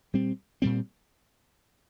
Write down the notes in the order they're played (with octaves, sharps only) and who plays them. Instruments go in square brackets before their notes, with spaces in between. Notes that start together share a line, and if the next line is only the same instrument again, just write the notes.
[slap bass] A#2 G3 C4
A#2 G3 C4